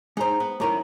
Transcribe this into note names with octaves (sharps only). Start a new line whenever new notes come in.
G#3 D#4 C5 A#5
B3
F#2 D#3 A3 E4 G4 A#5